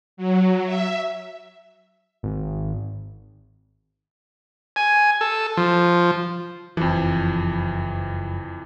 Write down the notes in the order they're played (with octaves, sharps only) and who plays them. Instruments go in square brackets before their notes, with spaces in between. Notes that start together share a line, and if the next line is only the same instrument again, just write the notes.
[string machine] F#3
E5
[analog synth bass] G#1
[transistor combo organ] G#5
A4
F3
[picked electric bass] F#1 F3 [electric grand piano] F2 E3